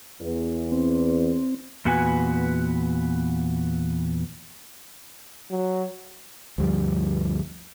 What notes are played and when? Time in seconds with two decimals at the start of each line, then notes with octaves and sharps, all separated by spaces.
0.21 E2
0.72 C4
1.85 E2 A#2 B3 F#4 B4 G#5
5.51 F#3
6.58 D2 G2 F3 G3